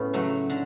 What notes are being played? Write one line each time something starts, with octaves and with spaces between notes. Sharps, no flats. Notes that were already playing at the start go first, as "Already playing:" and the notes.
Already playing: A2 B3 C#4 B4
C#3 F#3 A3
D3